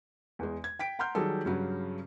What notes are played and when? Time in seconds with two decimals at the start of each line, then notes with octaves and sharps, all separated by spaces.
0.39 E2 G#3
0.64 G#6
0.79 G5 B6 D7
0.99 F#5 A#5 C6 F6 G6
1.15 D#3 F#3 G3 G#4 A4
1.45 G2 C#3 F#3